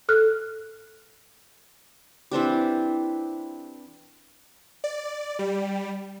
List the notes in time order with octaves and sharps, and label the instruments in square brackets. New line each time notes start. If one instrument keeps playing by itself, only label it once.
[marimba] A4 F6 F#6
[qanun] E3 C4 D4 G4
[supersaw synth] D5
G3